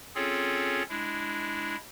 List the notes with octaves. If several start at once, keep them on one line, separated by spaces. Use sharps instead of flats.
C4 C#4 F4 G#4 A4 C#5
G#3 D4 E4